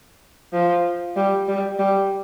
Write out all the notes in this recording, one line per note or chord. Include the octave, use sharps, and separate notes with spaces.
F3
G3
G3
G3